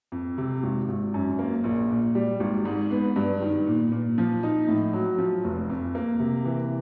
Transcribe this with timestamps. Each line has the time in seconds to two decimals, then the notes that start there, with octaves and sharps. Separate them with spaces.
0.12 F2
0.38 C3
0.63 G#1
0.89 G#1
1.14 F#2
1.39 A#3
1.64 A#1
1.89 A#2
2.15 G3
2.40 G#1
2.65 G#2
2.91 B3
3.16 G2
3.42 D#3
3.67 A#2
3.92 A#2
4.18 F3
4.43 D#4
4.68 A2
4.93 F#3
5.18 F3
5.44 F1
5.70 F2
5.95 A#3
6.20 C3
6.45 E3